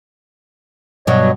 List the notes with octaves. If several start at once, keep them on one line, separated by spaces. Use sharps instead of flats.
G2 B2 F#3 C#5 D#5